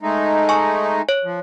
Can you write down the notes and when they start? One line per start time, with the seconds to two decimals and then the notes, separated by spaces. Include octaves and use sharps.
0.02 G#3 A3 D#4
0.49 G#5 C#6
1.09 C#5
1.24 F3